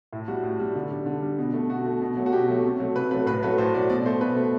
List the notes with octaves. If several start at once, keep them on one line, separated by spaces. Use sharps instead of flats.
A2 E4
G3 F#4
A2
G3
D3
G3
D3
G3
B2
A3
B2 F#4
A3
B2
F#3 A3
F#4
B2 G4
F#3 A3
C3
F#3 A3
C3 B4
F#3 A3 B4
A2 B4
F#3 A3 B4
A2 C5
F#3 A3 D5
B2 D5
A3 C5
B2 B4
A3